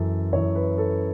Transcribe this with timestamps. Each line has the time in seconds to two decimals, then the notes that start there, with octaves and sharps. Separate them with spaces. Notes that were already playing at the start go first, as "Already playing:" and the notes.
Already playing: F#2 E3 A4
0.33 F#2 E3 C#5
0.55 B4
0.78 A4